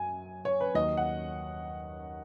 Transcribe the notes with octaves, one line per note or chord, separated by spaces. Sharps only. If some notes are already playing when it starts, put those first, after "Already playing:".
Already playing: F#2 G#5
C#5
B4
D#2 D#3 F#3 D#5
F#5